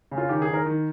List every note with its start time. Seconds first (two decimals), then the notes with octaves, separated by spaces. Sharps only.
0.11 C#3
0.18 F4
0.29 D#3 G4
0.42 G#4
0.48 D#3
0.54 A#4
0.66 D#3